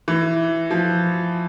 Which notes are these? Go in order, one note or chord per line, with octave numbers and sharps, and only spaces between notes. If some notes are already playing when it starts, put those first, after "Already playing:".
E3
F3